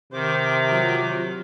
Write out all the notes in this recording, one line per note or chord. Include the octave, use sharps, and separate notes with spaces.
C3 D#3 C5 D6
F#3 F4